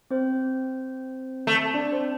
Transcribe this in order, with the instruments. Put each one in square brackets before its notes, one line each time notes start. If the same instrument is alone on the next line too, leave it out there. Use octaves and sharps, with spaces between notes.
[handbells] C4 C5
[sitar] A3
[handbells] D4 D5
C4 C5